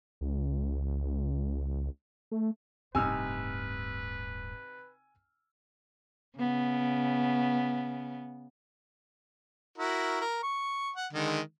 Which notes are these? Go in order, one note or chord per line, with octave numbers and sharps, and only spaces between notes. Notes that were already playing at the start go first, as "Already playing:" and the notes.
C#2
A3
D1 G2 C3 D#4 B4 G#5 E6 F6
C#3 B3
E4 F#4 A#4
A#4
C#6
F#5
D3 D#3 G#3